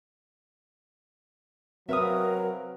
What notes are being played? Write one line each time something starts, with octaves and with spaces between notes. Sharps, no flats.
F#3 C4 A#4 B4 E5 F5 D#6